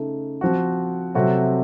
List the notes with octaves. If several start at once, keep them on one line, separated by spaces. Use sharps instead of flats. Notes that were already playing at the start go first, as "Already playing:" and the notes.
Already playing: C#3 A3 D#4
F3 C4 F#4
C3 F#3 A3 C4 F#4